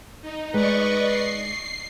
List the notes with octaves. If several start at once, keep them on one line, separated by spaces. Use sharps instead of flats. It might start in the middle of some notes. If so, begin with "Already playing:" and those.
D#4
G#3 B4 D5 D#5 C#6
C7